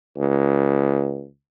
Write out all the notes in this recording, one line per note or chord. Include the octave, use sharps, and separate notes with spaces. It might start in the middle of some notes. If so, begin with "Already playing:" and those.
C#2